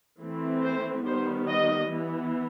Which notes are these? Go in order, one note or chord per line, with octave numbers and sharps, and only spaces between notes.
E3 A3 C4
C5
D#3 G3 B3 C5
D#5
E3 B3